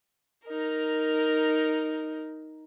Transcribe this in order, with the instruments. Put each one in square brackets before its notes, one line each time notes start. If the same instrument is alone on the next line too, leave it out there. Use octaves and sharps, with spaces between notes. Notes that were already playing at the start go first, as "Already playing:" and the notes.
[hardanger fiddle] D#4 A#4